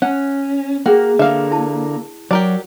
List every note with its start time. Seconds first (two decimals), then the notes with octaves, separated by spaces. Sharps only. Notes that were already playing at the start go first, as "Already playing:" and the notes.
0.02 C#4 F#5
0.86 A#3 F#4 G#4 G5
1.19 D3 A#3 E5 F5
1.51 E4 A5
2.31 F#3 G4 A#4 D5